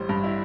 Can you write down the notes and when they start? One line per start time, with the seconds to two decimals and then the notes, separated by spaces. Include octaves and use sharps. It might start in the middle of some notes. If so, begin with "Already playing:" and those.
Already playing: A1 G3 C5
0.09 G2
0.23 E4